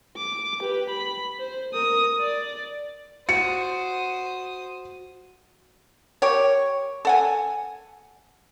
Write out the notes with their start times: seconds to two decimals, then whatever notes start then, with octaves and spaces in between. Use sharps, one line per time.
0.17 D6
0.60 G4 B4
0.90 B5
1.39 C5
1.74 A#4 D#6
2.21 D5
3.29 F#4 C5 D#6 C#7
6.22 G4 A#4 C#5
7.05 A4 F#5 G#5